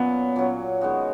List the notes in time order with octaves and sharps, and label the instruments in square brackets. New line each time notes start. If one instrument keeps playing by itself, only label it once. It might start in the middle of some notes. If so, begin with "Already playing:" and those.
Already playing: [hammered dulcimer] A#2 F#3 C#4 F#4 [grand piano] B3
[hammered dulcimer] A#2 F#3 C#4 F#4
D#3 G#3 B3 F#4